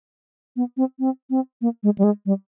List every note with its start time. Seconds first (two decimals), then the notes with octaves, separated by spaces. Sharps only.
0.56 B3
0.77 C4
0.99 C4
1.30 C4
1.62 A#3
1.83 G#3
1.98 G3
2.04 G#3
2.26 G3